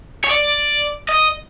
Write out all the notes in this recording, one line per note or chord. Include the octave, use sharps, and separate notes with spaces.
C#5
D5
D#5